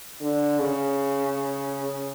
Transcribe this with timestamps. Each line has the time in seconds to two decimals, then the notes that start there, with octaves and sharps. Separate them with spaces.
0.21 D3
0.59 C#3